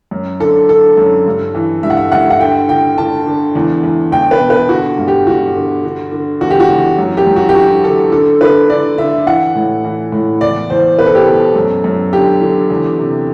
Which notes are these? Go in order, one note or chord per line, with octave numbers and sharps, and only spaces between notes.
F#2
D3 A4
D3 A4
F#2
G2
E3
G2 E5
F#5
E5
G2 F#5
E5
F#5
D3 G5
D3 G5
D3 A5
D3
E2
E2
E2 G5
B4
B2
B4
D3 F#4
G2
G4
G2 F#4
D3
D3
D3
E2 F#4
G4
F#4
E2
F#2
G4
F#2
F#4
G4
D3 F#4
D3 A4
D3 A4
D3 B4
D3 D5
D3 E5
E3 F#5
A2
E3
A2
E2 D5
E2 C5
B2 B4
A4
G4
B2 A4
F#2
F#2
D3 G4
D3
E2
C3